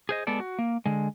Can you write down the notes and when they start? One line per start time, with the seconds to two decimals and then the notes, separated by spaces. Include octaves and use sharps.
0.09 G#4 C5 D#5
0.27 G#3 B3 A4 D5
0.40 F#4
0.59 A#3
0.86 D3 G#3